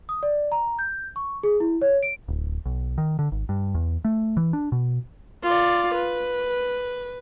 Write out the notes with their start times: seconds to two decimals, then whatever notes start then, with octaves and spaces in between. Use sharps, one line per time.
0.09 D#6
0.23 D5
0.52 A#5
0.79 G6
1.16 C#6
1.43 G#4
1.60 E4
1.82 C#5
2.03 D7
2.28 D1
2.66 B1
2.98 D#3
3.19 D3
3.32 G#1
3.49 G2
3.75 E2
4.05 A3
4.37 E3
4.53 D4
4.72 B2
5.43 F4 D5
5.95 B4